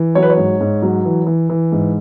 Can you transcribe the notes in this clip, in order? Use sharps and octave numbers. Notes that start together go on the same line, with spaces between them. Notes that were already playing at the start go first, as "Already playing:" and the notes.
Already playing: E3
F#3 C#5
B4
C#5
G#2
G#2
F#3
E3
E3
E3
G#2